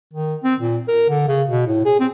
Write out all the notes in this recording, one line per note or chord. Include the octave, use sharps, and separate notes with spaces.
D#3
C4
A#2
A#4
D3
C#3
B2
A2
G#4
C4